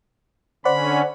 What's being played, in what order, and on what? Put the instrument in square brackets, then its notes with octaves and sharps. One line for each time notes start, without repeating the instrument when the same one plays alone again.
[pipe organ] D3 C#4 [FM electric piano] C5 D5 F#5 [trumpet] B5